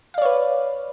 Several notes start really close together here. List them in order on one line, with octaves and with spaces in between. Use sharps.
F5 D5 C#5 B4